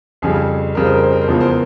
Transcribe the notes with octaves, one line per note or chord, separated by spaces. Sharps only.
F2 C#3 G3 G#4
F2 C#3 G3 A#4
C5
A#4
C5
A#4
C5
E2 C#3 F3 G#3 A#4
C5
A#4